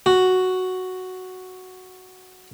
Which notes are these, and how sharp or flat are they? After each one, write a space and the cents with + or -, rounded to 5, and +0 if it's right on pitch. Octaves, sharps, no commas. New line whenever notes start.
F#4 +0